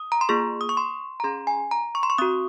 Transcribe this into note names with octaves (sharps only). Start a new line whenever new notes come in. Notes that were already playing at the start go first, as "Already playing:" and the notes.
Already playing: D#6
A#5
C6
A#3 F4 G#4 C#6
D#6
C#6
C6
A#5
C#4 G#4 C6
G#5
A#5
C#6
C6
C#6
C4 F#4 D#6